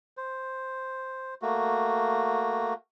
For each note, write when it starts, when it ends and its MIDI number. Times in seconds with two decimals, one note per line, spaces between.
0.17 1.34 72
1.42 2.74 57
1.42 2.74 58
1.42 2.74 66